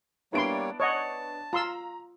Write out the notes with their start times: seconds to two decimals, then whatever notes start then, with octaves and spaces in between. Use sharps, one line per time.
0.33 G3 A#3 B3 D4 E4 C#5 C6 D7
0.80 C#5 D#5 F#5 A5
1.53 F4 A#5 C6 E6